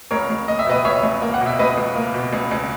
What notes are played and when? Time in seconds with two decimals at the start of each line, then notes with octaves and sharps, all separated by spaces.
0.11 C#2 A#4 C#5
0.30 C#2
0.48 A#3 D#5
0.59 E5
0.66 B2 B4 D#5
0.85 C#2 C#5 E5
1.03 C#2
1.22 A#3
1.34 F#5
1.41 B2
1.46 E5
1.59 C#2 B4 D#5
1.77 C#2
1.96 A#3
2.14 B2
2.33 C#2
2.51 C#2